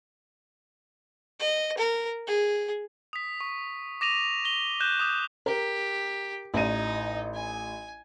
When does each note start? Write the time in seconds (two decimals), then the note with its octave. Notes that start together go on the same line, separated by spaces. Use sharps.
1.40 D#5
1.78 A#4
2.27 G#4
3.13 D#6 B6
3.41 C#6
4.01 D6 A#6 D#7 F7
4.45 A#6 G7
4.80 F#6 G6 E7
5.00 D6 D#6 G6
5.46 G4 A#4
6.54 A1 D#4 D5 D#7
7.34 G#5